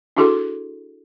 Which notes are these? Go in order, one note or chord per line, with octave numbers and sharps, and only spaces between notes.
D4 E4 F#4 G#4 A4 C6